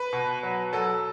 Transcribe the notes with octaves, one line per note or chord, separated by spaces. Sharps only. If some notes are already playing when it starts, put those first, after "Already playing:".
Already playing: B4
B2
F#3
F#3 A4